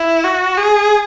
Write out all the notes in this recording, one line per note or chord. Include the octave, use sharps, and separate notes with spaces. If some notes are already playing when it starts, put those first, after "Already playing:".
Already playing: E4
F#4
G#4